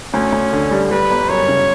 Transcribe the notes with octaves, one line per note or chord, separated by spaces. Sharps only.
D2 C#4
D2
D3
G3
G3 B4
G1
F#2 C#5
C#3